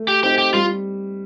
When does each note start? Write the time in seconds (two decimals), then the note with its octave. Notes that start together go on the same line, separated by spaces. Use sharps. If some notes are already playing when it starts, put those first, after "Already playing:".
Already playing: A3
0.08 G4
0.24 C4 D#4 G4
0.38 G4
0.53 G3 F4